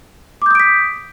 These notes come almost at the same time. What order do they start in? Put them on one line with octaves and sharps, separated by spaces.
D6 G6 D#6 D7 B6